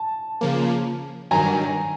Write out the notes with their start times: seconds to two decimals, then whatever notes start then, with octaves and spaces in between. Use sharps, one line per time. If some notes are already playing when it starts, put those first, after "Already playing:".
Already playing: A5
0.41 C#3 F3 A#3
1.31 G2 D#3 F#3 G#5 A#5